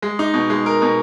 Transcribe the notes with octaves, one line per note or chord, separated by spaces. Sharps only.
G#3
D#4
B2
G#3
A#4
B2